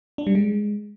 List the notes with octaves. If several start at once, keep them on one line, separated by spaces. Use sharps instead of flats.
D4
G3
G#3